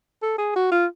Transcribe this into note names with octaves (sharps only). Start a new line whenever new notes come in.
A4
G#4
F#4
F4